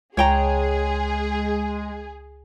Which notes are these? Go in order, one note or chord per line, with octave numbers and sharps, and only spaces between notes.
C#2 G#3 G#4 C#5 G5 A#5